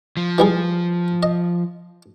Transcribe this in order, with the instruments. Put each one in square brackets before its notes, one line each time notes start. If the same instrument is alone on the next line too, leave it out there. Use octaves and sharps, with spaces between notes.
[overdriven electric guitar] F3
[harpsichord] E3 G3 G#4
D#5